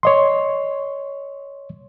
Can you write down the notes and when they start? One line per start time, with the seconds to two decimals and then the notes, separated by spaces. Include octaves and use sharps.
0.03 C#5 D#5 C6